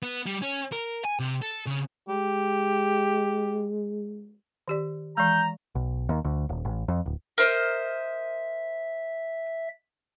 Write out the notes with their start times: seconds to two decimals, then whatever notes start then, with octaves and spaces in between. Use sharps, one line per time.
0.03 B3
0.26 G3
0.42 C#4
0.72 A#4
1.04 G#5
1.19 C3
1.42 A4
1.67 C#3
2.09 G#3 G4
4.68 D#3 G4 D5
5.17 E3 G#3 A#5 G6
5.75 B1
6.09 D#2
6.24 D2
6.49 D#1
6.65 A1
6.88 F2
7.06 D1
7.38 A#4 C5 D#5 E5